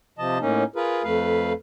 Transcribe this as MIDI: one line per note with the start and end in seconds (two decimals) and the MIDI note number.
0.18 0.38 48
0.18 0.38 53
0.18 0.38 75
0.18 0.38 81
0.41 0.63 45
0.41 0.63 58
0.41 0.63 61
0.41 0.63 63
0.76 1.03 65
0.76 1.03 68
0.76 1.03 70
0.76 1.03 71
1.04 1.53 41
1.04 1.53 57
1.04 1.53 71
1.04 1.53 77